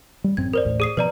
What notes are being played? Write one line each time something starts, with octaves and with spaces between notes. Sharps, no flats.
G3
A1 F#2 C4 G#6
A#4 C5 D5
A1 D#2 A2
G#4 D#6 C7
B2 F3 B4 D5 A#5